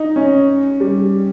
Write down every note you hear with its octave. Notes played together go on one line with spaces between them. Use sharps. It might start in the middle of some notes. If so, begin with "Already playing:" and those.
Already playing: D#4
C#4
G3